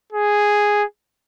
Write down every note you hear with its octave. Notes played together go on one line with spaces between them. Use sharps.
G#4